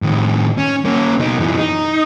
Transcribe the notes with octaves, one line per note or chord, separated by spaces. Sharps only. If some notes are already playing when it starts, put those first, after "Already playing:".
A2 D#3
C#4
A#3 C#4
B2 D#4
F#2 E3
D#4